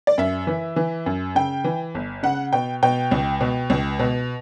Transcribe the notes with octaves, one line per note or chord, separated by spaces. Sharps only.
D5
F#2 E5
E3
E3
F#2
C#3 G5
E3
G1
C#3 F#5
B2 G5
B2 G5
C#2
B2
C#2
B2